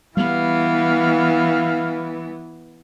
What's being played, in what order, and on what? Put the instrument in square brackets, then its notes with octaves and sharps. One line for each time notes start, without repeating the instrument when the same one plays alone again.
[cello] E3 [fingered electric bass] G3 [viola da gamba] B3 [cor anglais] F5